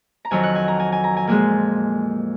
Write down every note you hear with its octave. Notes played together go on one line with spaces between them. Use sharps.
A#5
F2 D#3 F#3 G#5
F#5
G#5
A#5
G#5
G#5
A#5
G#5
A#2 F3 G#3 G#5